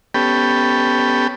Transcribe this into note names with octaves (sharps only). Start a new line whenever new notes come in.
B3 C#4 G4 A4 G5 B5